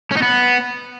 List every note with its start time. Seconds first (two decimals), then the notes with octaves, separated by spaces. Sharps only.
0.11 C#4
0.16 D#4
0.22 B3